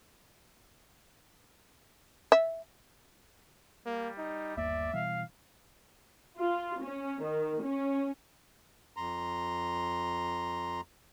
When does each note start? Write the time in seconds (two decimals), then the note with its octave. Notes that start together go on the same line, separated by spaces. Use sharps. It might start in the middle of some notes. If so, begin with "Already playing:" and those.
2.32 E5
3.86 G3 A#3
4.18 D#4
4.57 G1 D#2 A#3 D5 E5
4.93 B2 E3 G3 F5
6.38 F4
6.81 C#4
7.22 D#3
7.63 C#4
8.97 F2 A#5 C6